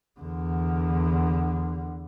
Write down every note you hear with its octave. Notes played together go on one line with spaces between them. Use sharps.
E2 D3